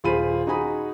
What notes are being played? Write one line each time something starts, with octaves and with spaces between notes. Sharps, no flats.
D#1 F4 G#4 C5 B5 D#7
D#4 F#4 G#4 G#5 B5 D#6